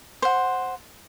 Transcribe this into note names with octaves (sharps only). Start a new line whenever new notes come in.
C5 F#5